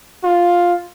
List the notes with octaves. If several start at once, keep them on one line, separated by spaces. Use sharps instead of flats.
F4